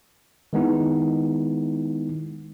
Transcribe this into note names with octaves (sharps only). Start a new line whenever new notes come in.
D#3 G#3 B3 D#4 E4